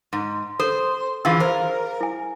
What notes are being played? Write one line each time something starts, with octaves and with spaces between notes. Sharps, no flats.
G#2
A4 C5
E3 F4 G#4 F5 E6
A#4 C5
E4 G#5